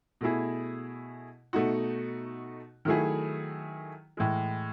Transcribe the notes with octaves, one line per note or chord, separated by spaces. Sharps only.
B2 A3 E4 G#4
B2 A3 D#4 F#4
D#3 F#3 A3 E4 G#4
A2 E3 G#3